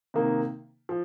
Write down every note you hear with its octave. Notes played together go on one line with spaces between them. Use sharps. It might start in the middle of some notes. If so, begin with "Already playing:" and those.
C3 D#3 A#3 D#4
F3